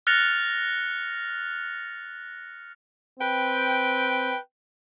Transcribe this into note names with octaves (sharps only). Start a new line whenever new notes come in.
F6 F#6 A6 A#6 C#7 F7
C4 B4 G5